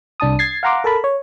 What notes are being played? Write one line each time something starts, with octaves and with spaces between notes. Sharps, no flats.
C2 D4 A5 D#6
G#6 A6 C7
F5 F#5 A#5 C6 D6
A4 A#4 A5 B5
C#5